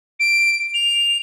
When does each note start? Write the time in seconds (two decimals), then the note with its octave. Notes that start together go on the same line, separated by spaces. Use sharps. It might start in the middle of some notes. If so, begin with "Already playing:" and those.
0.19 D7
0.74 F7